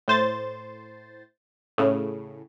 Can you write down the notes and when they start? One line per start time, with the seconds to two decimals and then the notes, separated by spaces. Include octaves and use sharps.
0.08 A2 C5 A6
1.78 A2 C#3